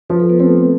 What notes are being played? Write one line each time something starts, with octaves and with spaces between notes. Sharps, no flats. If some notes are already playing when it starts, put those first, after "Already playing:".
F3 B4
A4
B3 B4
A3 C4 A4